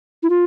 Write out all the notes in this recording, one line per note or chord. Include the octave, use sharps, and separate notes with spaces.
E4
F4